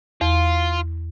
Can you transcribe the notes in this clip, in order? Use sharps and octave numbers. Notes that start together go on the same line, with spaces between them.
E2 F4